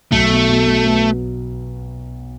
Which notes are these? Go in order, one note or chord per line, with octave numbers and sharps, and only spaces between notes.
B1 A3
B2
B2
B2
B3